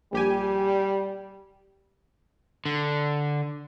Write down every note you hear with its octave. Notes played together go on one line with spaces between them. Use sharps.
A#1 G3 G4 G#5
D3